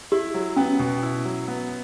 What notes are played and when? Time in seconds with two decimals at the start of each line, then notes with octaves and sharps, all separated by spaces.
0.12 E4 G4
0.34 F#3
0.56 B3 C#4
0.79 B2
1.02 E4
1.25 F#3
1.48 B3